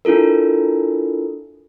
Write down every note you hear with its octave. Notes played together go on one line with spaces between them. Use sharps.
D4 E4 F4 A4 A#4